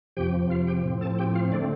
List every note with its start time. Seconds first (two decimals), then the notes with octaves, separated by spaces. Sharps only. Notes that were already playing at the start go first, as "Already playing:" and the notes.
0.17 F2 C3 F3 G4 G5
0.50 F4 F5
0.67 G4 G5
0.84 A2 F3 C4
1.01 A4 A5
1.19 G4 G5
1.35 F4 F5
1.52 D3 A3 C4 D4 D5